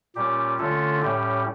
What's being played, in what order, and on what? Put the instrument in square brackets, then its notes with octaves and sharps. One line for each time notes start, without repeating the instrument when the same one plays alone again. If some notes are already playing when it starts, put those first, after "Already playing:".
[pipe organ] A#2 G3 C#4 G4
D3 A3 C#4 F4 A4
A2 G3 C#4 G4